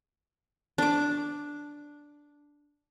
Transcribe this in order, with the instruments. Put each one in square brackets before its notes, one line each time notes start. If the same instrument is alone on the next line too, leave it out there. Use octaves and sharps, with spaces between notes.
[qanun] D4 D6